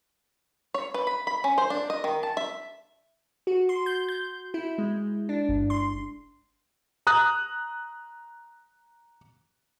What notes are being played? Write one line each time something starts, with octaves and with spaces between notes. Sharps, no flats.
C#5
B4
B5
B5
C#4
C5
D4
D#5
D#3
A5
E5
F#4
C6
G6
G6
E4
G#3
D4
G1
C6
A#5 D#6 F#6